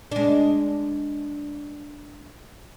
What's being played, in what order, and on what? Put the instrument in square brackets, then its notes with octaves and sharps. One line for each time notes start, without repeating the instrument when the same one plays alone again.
[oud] G#3 D4